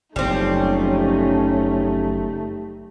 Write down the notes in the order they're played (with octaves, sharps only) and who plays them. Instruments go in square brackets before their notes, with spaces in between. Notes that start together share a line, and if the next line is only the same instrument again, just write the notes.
[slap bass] F#1 C#3 [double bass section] F3 C#4 [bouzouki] G3 C4 [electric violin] A3 D#4